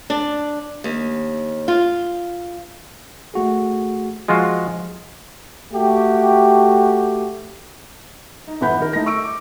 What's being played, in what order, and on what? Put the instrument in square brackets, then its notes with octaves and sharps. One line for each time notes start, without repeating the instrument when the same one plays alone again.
[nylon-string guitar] D4
D#2
F4
[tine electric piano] A3 F#4 G#4
[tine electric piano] F3 [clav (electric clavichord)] G#3 F4 F#4
[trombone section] A3 F#4 G4
[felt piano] D#4
G1 E2 B4 F#5 B5 G6
D#3 A#4
A3 D#4 E4 A#6
C#6 E6 D7
D6